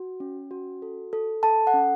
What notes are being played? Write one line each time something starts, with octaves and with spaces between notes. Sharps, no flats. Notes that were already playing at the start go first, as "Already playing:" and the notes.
Already playing: F#4
C#4
F#4
A4
A4
A4 A5
F#5
C#4